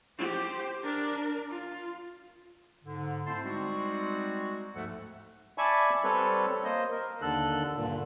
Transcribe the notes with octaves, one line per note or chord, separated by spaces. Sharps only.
G4 C5
D4 A#4
F4
G#2 D3
A3 C4 E4 C5 A5 C6
G3 G#3 C4 D#4 F#4
D2 G#2 F3 A3 A4 F#5
D5 E5 G#5 A5 B5 C#6
G3 C4 A4 B4 C#5
A#3 C5 D#5
A#4
D#2 D3 A4 F#6
G2 A#2 D3